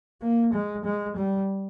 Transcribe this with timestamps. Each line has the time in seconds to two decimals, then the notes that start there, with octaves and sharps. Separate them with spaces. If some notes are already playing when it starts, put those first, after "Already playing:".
0.22 A#3
0.53 G#3
0.85 G#3
1.16 G3